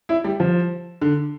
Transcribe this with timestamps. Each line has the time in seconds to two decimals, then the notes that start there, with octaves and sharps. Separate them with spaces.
0.09 E4
0.24 G3
0.40 F3
1.02 D3